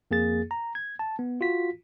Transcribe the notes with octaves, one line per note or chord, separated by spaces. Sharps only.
F2 A#3 G#4 A6
A#5
G#6
A5
B3
F4 F#4 B6